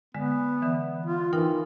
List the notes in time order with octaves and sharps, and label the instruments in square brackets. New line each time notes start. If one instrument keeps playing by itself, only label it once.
[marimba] D3 G#3 [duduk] B3
[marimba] D3 E3
[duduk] F4
[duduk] E3 [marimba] D#4 A#4 G5